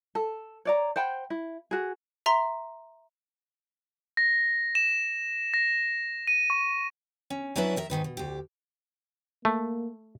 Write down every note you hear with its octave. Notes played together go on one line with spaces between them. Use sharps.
A4
C#5 D5 A#5
C5 F#5 G5 B5
E4
F#4 G#4
E5 A#5 C6
A#6
E7
A#6
D#7
C#6
C#4
F#3 C#4 D4 E4 B4 E5
D#3 A#4 E5
G#2 B2 D#3 B4
B2
D2 G4
A3 A#3